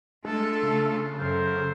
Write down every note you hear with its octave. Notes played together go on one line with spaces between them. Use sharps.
G#3 A3 D4 F4 A4
C#3
F#2 A4 A#4 C5